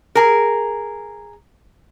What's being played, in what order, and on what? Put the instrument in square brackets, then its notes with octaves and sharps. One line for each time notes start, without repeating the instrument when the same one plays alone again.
[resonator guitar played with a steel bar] G#4 A#4